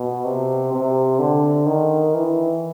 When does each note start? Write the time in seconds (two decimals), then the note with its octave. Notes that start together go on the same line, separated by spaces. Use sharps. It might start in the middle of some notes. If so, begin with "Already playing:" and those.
Already playing: B2
0.25 C3
0.72 C3
1.19 D3
1.67 D#3
2.14 E3